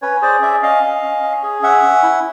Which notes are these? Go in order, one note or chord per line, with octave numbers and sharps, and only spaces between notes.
C#4 B4 C#5
G#4 C5 D5
C#4 D5 E5
C#4 D#5 F5
C#4
C#4
C#4
G#4
C#4 E5 F#5
C#4
E4